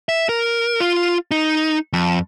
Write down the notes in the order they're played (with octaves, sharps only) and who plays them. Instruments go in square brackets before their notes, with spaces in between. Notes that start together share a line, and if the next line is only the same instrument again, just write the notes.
[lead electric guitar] E5
A#4
F4
D#4
F2